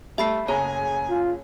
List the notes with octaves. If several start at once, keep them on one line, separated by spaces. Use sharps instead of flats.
G3 A3 E5 B5 C7
F#1 G#4 C#5 G#5 A#5
F4